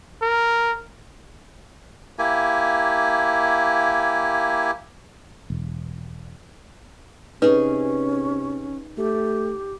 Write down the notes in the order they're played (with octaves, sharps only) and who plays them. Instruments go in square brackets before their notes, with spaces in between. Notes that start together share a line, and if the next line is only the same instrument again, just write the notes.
[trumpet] A#4
[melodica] A#3 E4 G4 G#5
[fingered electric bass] E1
[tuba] C3 [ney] C#4 [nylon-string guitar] D#4 G#4 [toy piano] B4
[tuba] A3 [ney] G4